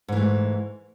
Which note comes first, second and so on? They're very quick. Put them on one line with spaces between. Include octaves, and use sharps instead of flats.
G#2 E3 A3